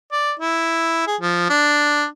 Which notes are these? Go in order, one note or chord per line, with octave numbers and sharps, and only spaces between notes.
D5
E4
G#4
F3
D4